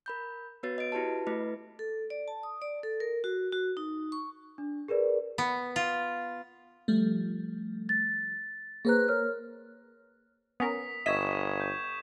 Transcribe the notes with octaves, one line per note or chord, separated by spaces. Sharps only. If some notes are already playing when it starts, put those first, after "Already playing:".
A#4 B5 G6
B3 F#4 B4 C#5 A6
D#5 D7
E4 F#4 G4 B4 A5
A3 E4 B4 D#5
A4
D5
A5
D#6
D5
A4
A#4
F#4
F#4
D#4
C#6
D4
G#4 A#4 B4 D5
B3
F4
F3 G3 A3
A6
A#3 G#4 B4 C5 A#5 F#6
A#4 C#5 F6
B3 C#4 A#4 D#6 B6
G1 D#5 E5 C#6 G#6 B6 E7
G6